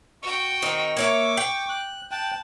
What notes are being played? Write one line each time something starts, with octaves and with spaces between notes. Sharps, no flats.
F#4 G5 C#6
D#3 C4 D#4
A#3 C#5 E5 D6
G5
F#6
G5 A5 F#6